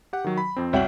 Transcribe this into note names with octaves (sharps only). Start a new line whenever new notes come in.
G4 F#5
D#3 F#3
B5
F2 C4
C2 F#4 C#5 E5 G5 F#7